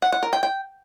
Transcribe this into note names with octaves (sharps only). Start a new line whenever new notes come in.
F#5
F#5
A#4
G5
G5